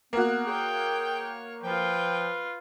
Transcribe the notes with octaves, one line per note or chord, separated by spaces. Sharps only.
A#3 B3 F#4
G#4 C#5 G5
F3 F4 B4 G5